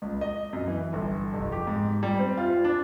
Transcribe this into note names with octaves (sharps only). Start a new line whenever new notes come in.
C#2
D#5
F#2
E3
G1
F1
G4
G#2
G3
C4
F4
D4